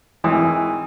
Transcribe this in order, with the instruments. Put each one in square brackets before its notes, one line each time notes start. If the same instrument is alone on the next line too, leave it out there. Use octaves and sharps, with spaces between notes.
[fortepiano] G#1 E3 D#6